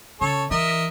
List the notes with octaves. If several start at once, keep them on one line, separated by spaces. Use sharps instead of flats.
C#3 A4 C#5
E3 A#4 D#5 E5